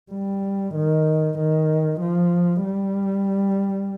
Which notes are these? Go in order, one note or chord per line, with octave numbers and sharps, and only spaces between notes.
G3
D#3
D#3
F3
G3